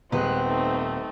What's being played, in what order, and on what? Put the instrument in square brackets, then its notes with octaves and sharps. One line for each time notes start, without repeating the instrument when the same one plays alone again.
[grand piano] D#1 [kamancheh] G#3 F#6 [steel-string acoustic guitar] B3 [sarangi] C4
[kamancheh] A3 D#4